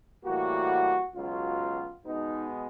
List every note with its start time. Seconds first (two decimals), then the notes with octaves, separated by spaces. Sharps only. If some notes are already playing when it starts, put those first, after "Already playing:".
0.24 A2 E3 G3 A#3 F#4
1.14 C#2 B2 F#3 F4
2.05 B2 G#3 B3 D#4